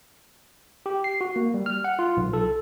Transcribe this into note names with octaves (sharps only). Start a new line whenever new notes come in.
G4
C7
F#4
A#3
G3
F6
F#5
F4
B1
A4